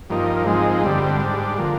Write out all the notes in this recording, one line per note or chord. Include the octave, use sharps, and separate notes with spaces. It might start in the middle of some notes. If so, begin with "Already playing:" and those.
G2 F3 A#3 D#4
G#2 F3 G#3 C4 D#4
G2 D3 G3 C4
G#2 G3 D4
D3 F3 A#3